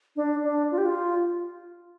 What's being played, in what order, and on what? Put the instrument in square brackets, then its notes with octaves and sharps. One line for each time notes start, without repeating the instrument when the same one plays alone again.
[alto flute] D4
D4
F4
G4
F4